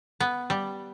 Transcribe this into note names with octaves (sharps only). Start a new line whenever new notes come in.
B3
G3